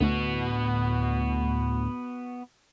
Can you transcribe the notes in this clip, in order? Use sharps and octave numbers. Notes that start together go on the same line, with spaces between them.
D2 A2 B3 F#4